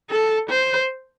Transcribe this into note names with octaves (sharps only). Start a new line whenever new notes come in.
A4
C5